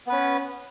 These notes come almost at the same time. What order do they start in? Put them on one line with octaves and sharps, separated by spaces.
B3 B4 C#4